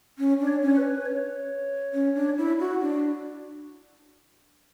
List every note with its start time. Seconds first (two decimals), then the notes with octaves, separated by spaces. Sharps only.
0.18 C#4
0.40 D4
0.47 C#5
0.62 C#4
0.77 B4
1.05 C#5
1.94 C#4
2.15 D4
2.37 E4
2.60 F#4
2.81 D4